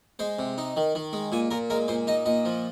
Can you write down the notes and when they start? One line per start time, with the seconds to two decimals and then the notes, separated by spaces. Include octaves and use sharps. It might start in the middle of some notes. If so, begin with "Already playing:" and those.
0.19 G#3 C5
0.39 C3
0.58 D#4
0.77 D#3
0.95 D#3
1.13 G#3
1.32 A#2 G#5
1.51 A#2 A#4
1.70 G#3 A#4
1.88 A#2 C5
2.07 D#4 D#5
2.26 A#2 D#5
2.45 F3